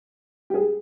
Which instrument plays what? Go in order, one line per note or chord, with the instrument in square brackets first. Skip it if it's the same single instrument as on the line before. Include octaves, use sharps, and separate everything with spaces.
[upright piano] G4
G#4